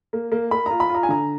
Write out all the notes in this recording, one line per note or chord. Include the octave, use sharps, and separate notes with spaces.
A#3
A#3
A#3 B5
F4 A#5
B5
F4
A#5
G#5
D3 A#5